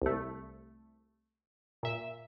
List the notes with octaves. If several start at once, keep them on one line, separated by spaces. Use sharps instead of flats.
C2 A3
A#2 E5